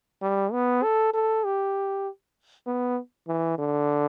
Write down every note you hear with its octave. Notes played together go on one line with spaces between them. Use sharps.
G3
B3
A4
A4
G4
B3
E3
D3